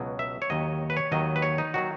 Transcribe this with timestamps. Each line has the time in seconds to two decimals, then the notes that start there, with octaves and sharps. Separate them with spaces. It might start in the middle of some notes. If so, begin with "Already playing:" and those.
Already playing: C#2 B2 F#3
0.19 E5
0.42 C#5
0.50 D#2 D#3 F#3 D#5
0.90 B4
0.97 C#5
1.12 D#2 D#3 F#3 D#5
1.36 B4
1.42 C#5
1.58 D#4
1.74 D#3 F#3 F#4